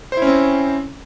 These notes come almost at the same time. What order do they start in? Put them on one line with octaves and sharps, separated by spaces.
C5 E4 C#4 C4